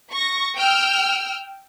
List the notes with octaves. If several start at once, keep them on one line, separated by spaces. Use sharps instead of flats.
C#6 A#6
G5 E6 F6